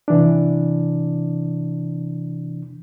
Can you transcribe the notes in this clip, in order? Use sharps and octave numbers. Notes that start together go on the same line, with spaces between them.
C3 E3 D4